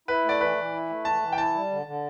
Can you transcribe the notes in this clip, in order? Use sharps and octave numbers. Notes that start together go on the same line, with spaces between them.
E4 B4
A3 D5
E3 B4
E3
E4
A3
E3 A5
E3
G5
E4 A5
G3
D3
D3